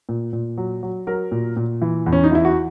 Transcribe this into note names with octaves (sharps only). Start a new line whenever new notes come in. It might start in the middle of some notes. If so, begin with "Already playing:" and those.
A#2
A#2
F#3
F#3
F#3 A#4
A#2
A#2
E3
E2
C#4
D#4
E3 E4
F#4